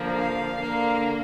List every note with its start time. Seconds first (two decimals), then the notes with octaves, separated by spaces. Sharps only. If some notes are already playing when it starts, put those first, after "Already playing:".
Already playing: D3 F3 A#3
0.10 F5
0.58 D3 A#3